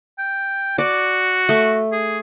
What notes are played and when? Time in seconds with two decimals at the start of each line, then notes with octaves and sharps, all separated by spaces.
0.19 G5
0.78 F#4 D5
1.49 A3
1.92 G#4